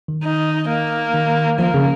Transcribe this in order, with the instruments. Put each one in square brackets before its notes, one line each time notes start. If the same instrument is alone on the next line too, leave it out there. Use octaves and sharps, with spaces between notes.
[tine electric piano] D#3
[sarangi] D#4
A#3
[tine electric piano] D#3
[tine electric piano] F3 [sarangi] A#3
[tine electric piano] C#3